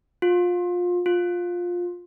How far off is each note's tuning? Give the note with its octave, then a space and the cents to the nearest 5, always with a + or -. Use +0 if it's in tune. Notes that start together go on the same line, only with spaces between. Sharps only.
F4 +25
F4 +15